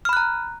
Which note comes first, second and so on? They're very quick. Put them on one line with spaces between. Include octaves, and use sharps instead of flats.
F6 B5 F#6 A#5